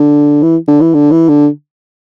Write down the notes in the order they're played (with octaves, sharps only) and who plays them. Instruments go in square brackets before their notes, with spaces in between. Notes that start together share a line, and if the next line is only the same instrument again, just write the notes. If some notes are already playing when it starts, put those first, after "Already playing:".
Already playing: [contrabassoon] D3
E3
D3
E3
D3
E3
D3